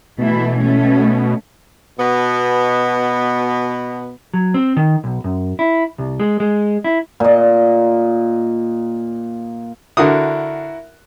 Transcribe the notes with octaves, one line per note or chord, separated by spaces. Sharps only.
B2 E3 A3 E4
A3 C#4
B2 B3
F#3
C4
D#3
B1
F#2
E4
C2
G#3
G#3
E4
A#2 D#5
D3 E4 F#4 A#4 D#6